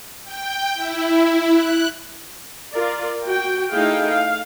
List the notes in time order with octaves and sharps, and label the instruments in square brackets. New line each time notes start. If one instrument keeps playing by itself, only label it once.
[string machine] G5
E4
F#6
[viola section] F4 A#4 D5
F#4 G5
A3 D#4 E4 G#4 F5 G5
F5